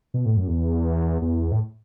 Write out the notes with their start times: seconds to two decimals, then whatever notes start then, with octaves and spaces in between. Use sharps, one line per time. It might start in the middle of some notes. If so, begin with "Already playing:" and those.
0.14 B2
0.26 A2
0.37 F#2
0.48 E2
1.22 E2
1.52 A2